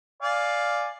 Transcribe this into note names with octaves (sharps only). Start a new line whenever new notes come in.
D5 F5 G#5